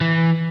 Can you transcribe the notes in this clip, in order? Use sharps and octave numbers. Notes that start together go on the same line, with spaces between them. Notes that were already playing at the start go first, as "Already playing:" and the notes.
E3